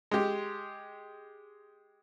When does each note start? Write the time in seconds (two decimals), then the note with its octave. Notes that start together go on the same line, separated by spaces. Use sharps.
0.11 G#3 G4